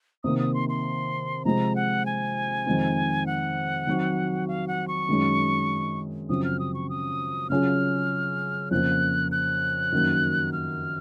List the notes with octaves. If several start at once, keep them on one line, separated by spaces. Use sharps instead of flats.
C3 D#3 A#3 D#6
D#6
C6
C6
C3 F3 G#3 C4 A#5
F#5
G#5
F2 D#3 G#3 C4 D#4
F#5
D#3 F#3 C4 F#4
F5
F#5
C#6
F#2 D#3 G#3 C#4
F#2 C#3 F3 C4 D#6
F6
D#6
C#6
D#6
C#3 F#3 C#4 F4 G#4 F6
F2 C#3 F3 A#3 F#6
F#6
F#2 D#3 A#3
F6